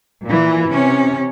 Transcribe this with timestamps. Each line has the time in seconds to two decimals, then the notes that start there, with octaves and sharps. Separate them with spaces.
0.25 A#2 E3
0.69 C3 C#4